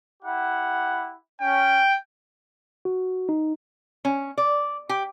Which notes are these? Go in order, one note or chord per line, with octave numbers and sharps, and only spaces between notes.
E4 G4 F#5
C#4 G5
F#4
D#4
C#4
D5
G4